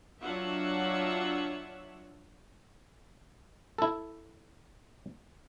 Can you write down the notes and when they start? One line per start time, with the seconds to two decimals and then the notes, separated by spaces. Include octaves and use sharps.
0.20 F#3 D4 F4 C#5 E5 F#5
3.78 E4 A4